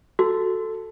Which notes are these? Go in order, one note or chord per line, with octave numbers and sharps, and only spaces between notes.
F#4 A4